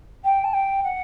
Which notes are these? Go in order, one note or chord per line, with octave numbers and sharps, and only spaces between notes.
G5
A5
G5
F#5